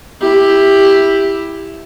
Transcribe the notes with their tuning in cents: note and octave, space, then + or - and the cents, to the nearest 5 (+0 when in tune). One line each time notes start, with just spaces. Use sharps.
E4 +0 G4 +10